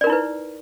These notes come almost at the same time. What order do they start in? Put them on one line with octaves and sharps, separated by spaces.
D5 A#4 D#4 E4 B4